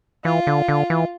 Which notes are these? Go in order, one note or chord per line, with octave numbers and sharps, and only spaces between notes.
E3 F4
D3
D3
E3